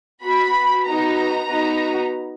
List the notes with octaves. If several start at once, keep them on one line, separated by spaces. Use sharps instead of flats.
B3 F#4 B5
B3 D#4 F#4 A#5
B3 D#4 F#4